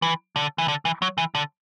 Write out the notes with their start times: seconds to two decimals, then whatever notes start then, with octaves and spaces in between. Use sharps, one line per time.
0.02 E3
0.36 D3
0.58 E3
0.68 D3
0.85 E3
1.02 F#3
1.18 E3
1.35 D3